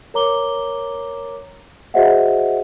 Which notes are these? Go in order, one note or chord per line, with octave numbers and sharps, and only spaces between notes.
A#4 C#5 A#5 D6 G7
F#4 G#4 C5 D#5 E5 F#5